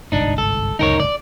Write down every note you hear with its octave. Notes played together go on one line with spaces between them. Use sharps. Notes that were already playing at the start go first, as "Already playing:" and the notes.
G1 C2 G#2 D4 D#4
A4
D1 C#2 F#2 D#4 A#4 C#5
D5